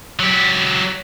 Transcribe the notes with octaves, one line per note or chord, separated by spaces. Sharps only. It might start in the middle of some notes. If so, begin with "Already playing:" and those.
F#3 G4